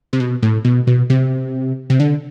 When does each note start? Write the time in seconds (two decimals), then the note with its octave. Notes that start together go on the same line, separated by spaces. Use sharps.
0.13 C3
0.20 B2
0.43 A2
0.65 B2
0.87 B2
1.10 C3
1.90 C3
2.00 D3